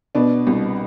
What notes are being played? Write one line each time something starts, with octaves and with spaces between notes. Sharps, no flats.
B2 B3 D4
C2